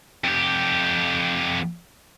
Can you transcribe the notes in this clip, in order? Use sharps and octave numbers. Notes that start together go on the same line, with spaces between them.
F2 G4